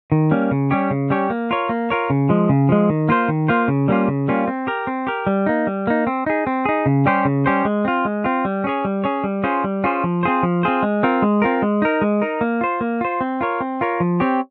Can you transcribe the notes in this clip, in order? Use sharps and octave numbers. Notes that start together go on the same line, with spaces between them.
D#3
G3 A#3 C#4
C#3
G3 C#4 G4 C#5
C#3
G3 C#4 G4 C#5
A#3
F4 A#4 C#5
A#3
F4 A#4 C#5
C#3
F3 G#3
C#3
F3 G#3
D#3
A#3 F4 C5
D#3
A#3 F4 C5
C#3
G3 A#3 C#4 F4
C#3
G3 A#3 C#4 F4
C4
G4 A#4
C4
G4 A#4
G3
A#3 D#4
G3
A#3 D#4
C4
D#4 G#4
C4
D#4 G#4
C#3
G3 C#4 G4 C5
C#3
G3 C#4 G4 C5
G#3
C4 F4
G#3
C4 F4
G3
C#4 G#4 C#5
G3
C#4 G#4 C#5
G3
C#4 F4 G#4 C5
G3
C#4 F4 G#4 C5
F3
C4 F4 G#4 C5
F3
C4 F4 G#4 C5
G#3
C4 F4 A#4
G#3
C4 F4 A#4
G#3
D#4 A#4
G#3
D#4 A#4
A#3
F4 C5
A#3
F4 C5
C4
F4 A#4 C#5
C4
F4 A#4 C#5
F3
C4 G4 C#5